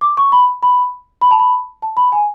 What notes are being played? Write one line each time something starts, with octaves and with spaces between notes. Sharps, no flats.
D6
C#6
B5
B5
B5
A5
B5
A5
B5
G#5